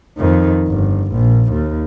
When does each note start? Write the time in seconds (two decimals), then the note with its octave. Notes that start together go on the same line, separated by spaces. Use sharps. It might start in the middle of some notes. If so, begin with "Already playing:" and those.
0.18 F2 D#3
0.67 G1
1.12 A#1
1.53 D#2